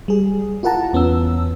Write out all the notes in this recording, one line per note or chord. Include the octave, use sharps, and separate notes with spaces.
G3 G#4
E4 F4 A#4 F#5 A5 A#5
E2 B3 C#4 E6